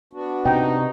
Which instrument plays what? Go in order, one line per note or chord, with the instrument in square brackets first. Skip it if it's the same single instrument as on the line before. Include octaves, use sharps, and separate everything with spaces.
[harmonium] B3 D4 F#4
[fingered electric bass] C3 [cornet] D#4 [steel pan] G5